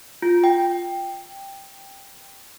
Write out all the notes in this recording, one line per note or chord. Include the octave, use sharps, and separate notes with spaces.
F4
G5